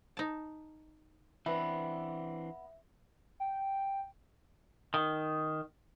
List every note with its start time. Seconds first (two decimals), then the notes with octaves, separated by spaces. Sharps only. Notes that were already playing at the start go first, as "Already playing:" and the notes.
0.17 D#4 A5
1.46 E3 B3 C4 D4 E5
3.40 G5
4.94 D#3